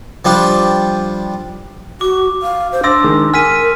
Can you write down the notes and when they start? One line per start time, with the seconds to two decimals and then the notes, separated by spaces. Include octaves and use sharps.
0.25 F3 G3 D4
2.01 F#4 D6
2.42 F5
2.72 C5
2.83 D4 C6 D6 E6 A6 A#6
3.04 D#3 G#3
3.34 A#4 G#5 F6 B6 D#7